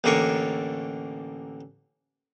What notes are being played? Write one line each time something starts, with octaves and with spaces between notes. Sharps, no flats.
A1 D3 A#3 D4 C#6